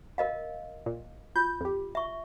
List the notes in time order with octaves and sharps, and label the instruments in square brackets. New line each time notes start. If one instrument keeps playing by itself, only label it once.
[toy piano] A#4 D#5 F5
[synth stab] A#2
[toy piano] F4 [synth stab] G6
[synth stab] F2 G4
[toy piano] E5 C#6